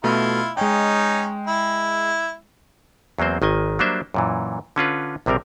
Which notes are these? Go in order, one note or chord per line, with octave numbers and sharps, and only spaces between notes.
B2 A3 E4 F4
G#3 C#4 D#4 G5
E4
E2 F#3 A#3 C4 C5
G#1 D#3 D#5 G#5
F#3 G3 A#3 D4 C5 E5
F#2 A#2 E3
D3 C#4 F4 B4
A#1 C3 G3 C4 A#4